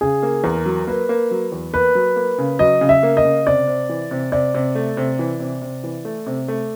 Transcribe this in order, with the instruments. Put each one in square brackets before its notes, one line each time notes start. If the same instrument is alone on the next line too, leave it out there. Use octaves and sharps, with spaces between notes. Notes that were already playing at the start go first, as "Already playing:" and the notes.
[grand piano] C#3 [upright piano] G#4
[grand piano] A#3
[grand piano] E2 [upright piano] A#4
[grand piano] F#3
[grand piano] A#3 [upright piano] B4
[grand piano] A#3
F#3
E2
[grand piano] A#3 [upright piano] B4
[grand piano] F#3
A#3
C#3
[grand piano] F#3 [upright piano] D#5
[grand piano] C#3
[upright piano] E5
[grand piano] A#3
[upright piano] D#5
[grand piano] C#3
[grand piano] C3 [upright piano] D5
[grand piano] C3
E3
C3
[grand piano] C3 [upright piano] D5
[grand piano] C3
A3
C3
E3
C3
C3
E3
A3
C3
A3